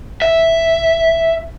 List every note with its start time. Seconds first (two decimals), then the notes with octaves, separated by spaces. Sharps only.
0.22 E5